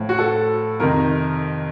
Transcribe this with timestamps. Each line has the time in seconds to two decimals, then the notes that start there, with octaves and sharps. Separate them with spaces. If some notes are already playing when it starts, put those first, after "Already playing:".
Already playing: A2 F3
0.09 F#4
0.19 A4
0.80 F2 C3 D#3 A#4